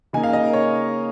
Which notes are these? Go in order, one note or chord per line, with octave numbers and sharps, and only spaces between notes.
C#3 A#3 D#4 G#5
F5
D#5
A#4
C#5